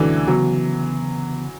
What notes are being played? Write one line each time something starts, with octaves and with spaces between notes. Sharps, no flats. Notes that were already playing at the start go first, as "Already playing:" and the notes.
Already playing: C#2 B2 D3 E3 F#3 A3 C#4
C#3 E3 F#3 B3